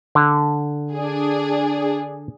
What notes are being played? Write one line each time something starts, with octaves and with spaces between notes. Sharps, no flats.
D3
D4 G#4